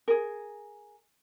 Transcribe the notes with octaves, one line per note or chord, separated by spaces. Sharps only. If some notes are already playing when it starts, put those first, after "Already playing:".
G#4 A#4